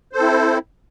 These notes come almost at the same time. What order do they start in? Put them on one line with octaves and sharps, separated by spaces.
C5 A4 C4 E4